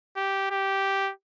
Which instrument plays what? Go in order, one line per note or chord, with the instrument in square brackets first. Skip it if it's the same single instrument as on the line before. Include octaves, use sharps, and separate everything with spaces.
[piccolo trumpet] G4
G4